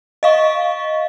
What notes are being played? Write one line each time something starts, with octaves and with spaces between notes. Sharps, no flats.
D#5 F5 C#6